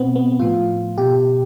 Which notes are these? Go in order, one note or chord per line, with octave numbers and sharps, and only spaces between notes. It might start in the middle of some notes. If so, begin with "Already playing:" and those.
Already playing: B2 B3 C4
B3
A2 F3 F4
B2 G4